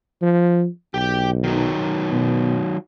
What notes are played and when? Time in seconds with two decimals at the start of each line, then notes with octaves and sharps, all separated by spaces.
0.22 F3
0.94 B1 G4 G5
1.44 D#3 F#3
2.10 B2